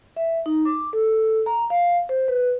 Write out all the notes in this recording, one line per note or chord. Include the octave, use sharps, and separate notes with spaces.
E5
D#4
D6
A4
A#5
F5
C5
B4